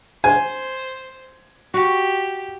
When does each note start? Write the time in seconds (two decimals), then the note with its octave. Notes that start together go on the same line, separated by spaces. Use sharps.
0.24 C5 G#5
1.74 F#4 G4